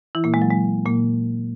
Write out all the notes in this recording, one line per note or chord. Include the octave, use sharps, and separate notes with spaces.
E3 E4
A#2 A#3
G#3
F#3
G#3
A#2 A#3